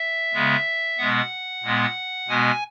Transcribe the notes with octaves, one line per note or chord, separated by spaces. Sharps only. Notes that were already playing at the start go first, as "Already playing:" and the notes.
Already playing: E5
C#3 G#3 B3
B2 G#3 B3 F#5
A#2 G#3 B3
B2 G#3 B3 G#5